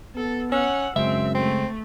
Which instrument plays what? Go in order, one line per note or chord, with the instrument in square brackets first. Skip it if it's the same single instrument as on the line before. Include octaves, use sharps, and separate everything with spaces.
[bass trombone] B3 [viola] A4
[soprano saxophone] C#4 [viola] F#5 [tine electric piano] E6
[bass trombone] F#2 [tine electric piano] C#3 G#3 G#4 [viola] C4 [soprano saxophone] E5
[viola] A3 [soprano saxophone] C4